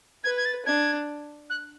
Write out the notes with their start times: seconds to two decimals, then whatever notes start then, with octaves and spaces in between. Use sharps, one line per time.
0.24 B4 G#6
0.37 G#6
0.45 A6
0.66 D4 G#6
1.50 F#6